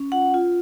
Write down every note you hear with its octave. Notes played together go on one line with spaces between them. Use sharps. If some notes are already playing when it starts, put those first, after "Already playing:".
Already playing: C#4
F4 F#5
F4